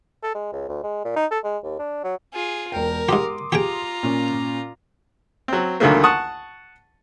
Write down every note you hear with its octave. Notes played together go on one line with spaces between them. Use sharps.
A4
G#3
C#2
D2
G#3
A#2
D#4
A4
G#3
D#2
D4
F#3
F4 G#4
E1 A#4 G5
G#2 G4 C6 D6 D#6
F4 G4 G#4 G5 A#5
A#2 C#4
F#3 C4
C#2 D3 D#3 F#3 A3 A#3
F#5 A5 C#6 D#6